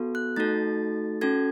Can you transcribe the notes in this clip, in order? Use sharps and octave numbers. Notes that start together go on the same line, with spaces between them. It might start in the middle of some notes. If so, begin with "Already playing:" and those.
Already playing: B3 F#4 A4
F#6
A3 D#4 F#4 A4 A6
C#4 F#4 A4 G#6